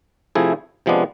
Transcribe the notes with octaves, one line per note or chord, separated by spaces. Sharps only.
C3 F3 A3 E4 G#4
C3 F3 G#3 B3 D4